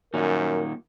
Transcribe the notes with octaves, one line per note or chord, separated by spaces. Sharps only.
F#2 A#2 D#3 A#4